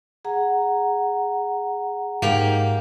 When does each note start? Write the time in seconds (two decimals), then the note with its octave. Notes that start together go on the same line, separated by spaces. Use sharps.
0.25 G#4 F#5 A#5
2.22 G#2 A#3 G4